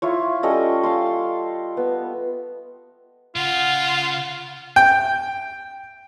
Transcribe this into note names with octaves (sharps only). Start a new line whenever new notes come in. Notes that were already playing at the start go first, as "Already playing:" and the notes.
E4 F4 C#5
G3 C#4 A4 D#5
F5 A5 C6
B3
C#3 F4 F#5
G5